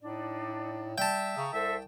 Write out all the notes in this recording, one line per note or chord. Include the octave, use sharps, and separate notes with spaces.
A2 D4 D#4 D5
G3 E5 G5 A5
C#3 A#5 C#6 D#6
C2 A4 C5 E5